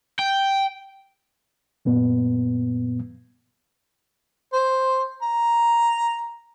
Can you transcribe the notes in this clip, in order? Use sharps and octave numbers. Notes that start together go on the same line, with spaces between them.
G5
F#2 A#2 B3
C5
A#5